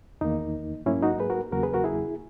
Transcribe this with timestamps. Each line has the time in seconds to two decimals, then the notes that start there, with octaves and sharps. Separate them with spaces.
0.21 E2 D#3 A#3 D#4
0.86 G#2 F#3 A#3 C#4 E4
1.03 D#4 F#4
1.20 G#4 B4
1.30 F#4 A#4
1.52 E2 C#3 F#3 A#3 F#4 A#4
1.63 G#4 B4
1.74 F#4 A#4
1.84 E4 G#4